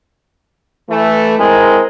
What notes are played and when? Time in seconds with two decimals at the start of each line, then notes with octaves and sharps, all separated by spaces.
0.90 E3 A3
1.39 G#3 C4 E4 A#4